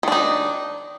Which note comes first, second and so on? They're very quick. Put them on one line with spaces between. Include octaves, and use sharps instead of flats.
D#3 D4 D#4